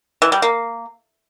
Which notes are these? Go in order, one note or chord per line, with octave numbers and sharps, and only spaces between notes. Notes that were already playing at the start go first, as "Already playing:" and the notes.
E3
G3
A#3